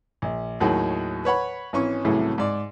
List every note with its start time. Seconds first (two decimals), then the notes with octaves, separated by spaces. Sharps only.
0.22 A#1
0.60 D#2 A2 D#3 F#3 G#4 F#5
1.25 B4 C#5 F#5 B5
1.73 G#1 E3 C#4 C#6
2.05 C2 A2 C#3 E3 F#3 A3
2.38 G#2 D5